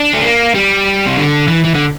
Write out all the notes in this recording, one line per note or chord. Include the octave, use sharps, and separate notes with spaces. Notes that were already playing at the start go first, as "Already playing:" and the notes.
Already playing: D4
A3
A#3
G3
C3
D3
E3
E3
D3